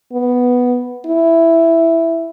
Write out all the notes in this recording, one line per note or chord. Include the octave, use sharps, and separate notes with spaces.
B3
E4